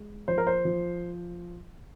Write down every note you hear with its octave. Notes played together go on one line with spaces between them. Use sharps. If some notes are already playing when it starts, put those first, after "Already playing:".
Already playing: G#3
F3 C5
A#4
C5
F3